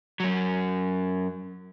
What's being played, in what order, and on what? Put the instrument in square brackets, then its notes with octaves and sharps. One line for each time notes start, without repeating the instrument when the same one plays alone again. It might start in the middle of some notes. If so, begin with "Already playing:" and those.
[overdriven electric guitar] F#2 F#3